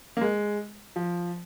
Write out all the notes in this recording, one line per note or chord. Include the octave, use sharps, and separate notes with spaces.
A#3
G#3
F3